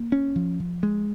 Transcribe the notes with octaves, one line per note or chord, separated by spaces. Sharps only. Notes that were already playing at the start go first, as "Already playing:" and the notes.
Already playing: A#3
C#4
F3
F3
G#3